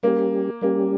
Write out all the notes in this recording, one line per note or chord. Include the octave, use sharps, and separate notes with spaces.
G3 A#3 C#4 G4
G3 A#3 C#4 G4